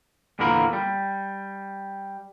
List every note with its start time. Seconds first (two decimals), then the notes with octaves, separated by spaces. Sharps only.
0.39 E2 A#2 D3 A#3 A#4 B5
0.73 G3